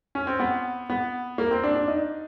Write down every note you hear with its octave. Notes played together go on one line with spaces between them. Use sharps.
C#4
C4
B3
B3
A#3
C4
D4
D4
D#4